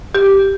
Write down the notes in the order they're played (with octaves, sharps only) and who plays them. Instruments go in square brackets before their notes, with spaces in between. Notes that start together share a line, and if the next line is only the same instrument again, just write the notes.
[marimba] G4